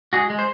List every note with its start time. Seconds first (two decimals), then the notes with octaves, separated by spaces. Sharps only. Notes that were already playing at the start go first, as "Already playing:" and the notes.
0.13 G#3 F#4 G#4
0.30 G#3
0.39 C5